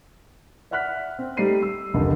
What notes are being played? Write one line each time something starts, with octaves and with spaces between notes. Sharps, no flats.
D5 E5 F#5 F6 F#6 B6
C4
G3 A3 D#4 C7 D#7
E6
F1 C#2 D3 D#3 A4